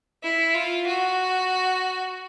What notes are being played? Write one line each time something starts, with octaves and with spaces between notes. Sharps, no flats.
E4
F4
F#4